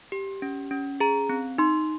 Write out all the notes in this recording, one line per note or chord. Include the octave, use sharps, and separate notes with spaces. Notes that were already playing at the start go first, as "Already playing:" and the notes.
G4
C#4
C#4
G#4 A#5
C4
D#4 C6